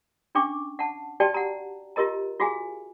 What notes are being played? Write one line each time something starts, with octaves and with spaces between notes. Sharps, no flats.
C#4 D4 G5 C#6 D6
F#5 A5
F#4 G4 D5 G5 A5
F#5 A#5
F4 G4 A#4 D#5 A#5
F4 F#4 G#4 F5 G#5